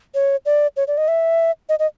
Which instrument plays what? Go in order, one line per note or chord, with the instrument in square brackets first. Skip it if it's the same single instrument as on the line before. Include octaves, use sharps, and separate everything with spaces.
[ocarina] C#5
D5
C#5
D5
D#5
E5
D#5
D#5